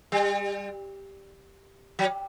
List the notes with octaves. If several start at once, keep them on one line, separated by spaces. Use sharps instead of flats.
G3
F#3